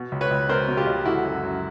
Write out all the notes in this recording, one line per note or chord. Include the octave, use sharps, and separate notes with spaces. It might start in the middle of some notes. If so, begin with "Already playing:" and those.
Already playing: B2
C#2
B4 C#5
C#2
B2 A#4 C5
B2
F4 G4
C#2
D3 E4 F#4
F#2
F#2